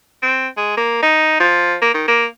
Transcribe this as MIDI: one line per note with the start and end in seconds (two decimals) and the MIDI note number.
0.22 0.48 60
0.57 0.76 56
0.77 1.01 58
1.02 1.37 63
1.40 1.76 53
1.82 1.91 58
1.94 2.06 51
2.08 2.25 58